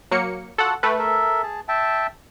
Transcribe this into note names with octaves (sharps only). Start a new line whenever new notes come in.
F#3 A#3 C#7
F4 F#4 A4 F#5
A3 B4 G5
A4 A#4 E5
G#4 A5
E5 G5 A5